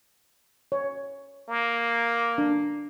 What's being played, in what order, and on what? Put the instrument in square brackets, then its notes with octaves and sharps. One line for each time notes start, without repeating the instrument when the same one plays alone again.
[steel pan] C#5
[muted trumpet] A#3
[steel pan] D4